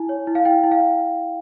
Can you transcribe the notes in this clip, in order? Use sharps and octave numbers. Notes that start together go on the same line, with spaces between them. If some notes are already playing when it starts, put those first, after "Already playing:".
Already playing: E4 G#5
C#5
E4
F5
E4 G5
E4
F5